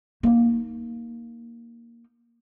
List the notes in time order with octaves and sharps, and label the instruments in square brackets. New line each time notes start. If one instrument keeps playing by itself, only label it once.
[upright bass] A#3 D#4